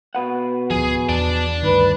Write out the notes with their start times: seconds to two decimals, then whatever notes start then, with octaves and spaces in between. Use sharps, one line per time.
0.15 B2 B4 F#5
0.71 D1 F3 G#4
1.09 E2 D5 A5
1.63 D2 G2 D#3 B4